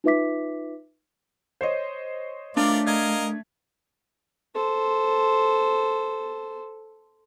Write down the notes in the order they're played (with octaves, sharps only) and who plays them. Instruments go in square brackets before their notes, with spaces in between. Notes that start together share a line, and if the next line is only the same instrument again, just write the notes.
[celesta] D#4 F4 B4 E5 D6 B6
[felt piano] C5 C#5 D#5
[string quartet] A3 [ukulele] D4 [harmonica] F4 A#4 D5
[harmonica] A#4 D#5 F5 [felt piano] G#6
[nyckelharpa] A4 C5